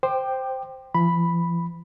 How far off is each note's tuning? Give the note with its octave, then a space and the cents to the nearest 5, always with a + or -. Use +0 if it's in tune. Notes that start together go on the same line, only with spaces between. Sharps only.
C5 +0 G5 +0 D6 +30
F3 -45 B5 +0